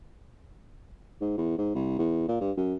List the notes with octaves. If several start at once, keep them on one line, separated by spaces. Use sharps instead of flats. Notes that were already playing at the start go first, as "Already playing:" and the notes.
G#2
E2
G#2
C2
E2
A#2
G2
F#2